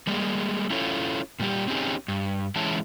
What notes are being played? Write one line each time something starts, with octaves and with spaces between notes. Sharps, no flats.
G3 G#3 A#3
C#4 E4 F4 A4 C#5
A#2 G3 G4
C4 C#4 D#4 G4 G#4
G2
E3 G#3 C#4 E4 A5